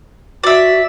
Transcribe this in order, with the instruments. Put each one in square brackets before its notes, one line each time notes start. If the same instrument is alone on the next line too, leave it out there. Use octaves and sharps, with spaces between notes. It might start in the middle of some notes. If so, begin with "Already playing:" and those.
[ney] F#4 [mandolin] D5 E5